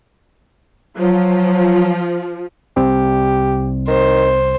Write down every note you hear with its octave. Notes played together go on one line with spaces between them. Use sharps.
F3 F#3
C2 C4 G4
D#3 C5